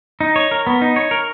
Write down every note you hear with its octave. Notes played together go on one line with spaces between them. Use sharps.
D#4
C#5
A#4
B3
D#4
C#5
A#4